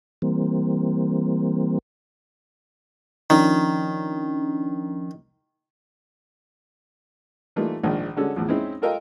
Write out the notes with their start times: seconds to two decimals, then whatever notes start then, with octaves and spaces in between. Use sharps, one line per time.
0.22 E3 G3 A#3 C4
3.30 D#3 F3 C#4 D4
7.56 E3 G3 A3 A#3 D#4 F4
7.83 A#1 G#2 D#3 F3 D4
8.17 D3 G3 G#3 C#4 F#4 A4
8.36 E2 A2 F3
8.49 G#3 C4 C#4 D#4 E4
8.82 F4 A4 A#4 D#5 F5 G5